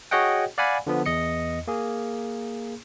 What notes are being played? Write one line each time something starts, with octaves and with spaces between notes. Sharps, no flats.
F#4 G#4 C#5 D#5 F#5 G5
D5 F5 F#5 G#5 B5
D3 F3 B3
E2 D#5 C#7
A#3 G#4